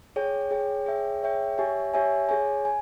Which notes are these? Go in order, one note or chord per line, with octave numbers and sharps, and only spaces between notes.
G#4 C#5 G5
G#4 C#5 G5
G#4 C#5 E5 G5
G#4 C#5 E5 G5
G4 C#5 E5 G#5
G4 C#5 E5 G#5
G#4 C#5 G#5
G#5